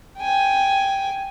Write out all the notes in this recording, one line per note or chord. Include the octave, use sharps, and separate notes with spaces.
G5 G#5